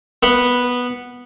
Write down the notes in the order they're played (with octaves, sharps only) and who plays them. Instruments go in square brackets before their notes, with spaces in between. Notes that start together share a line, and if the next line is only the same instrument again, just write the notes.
[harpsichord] B3 B4 F#5